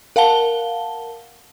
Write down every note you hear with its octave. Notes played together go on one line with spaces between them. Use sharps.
A#4 F5 F#5 A5 G7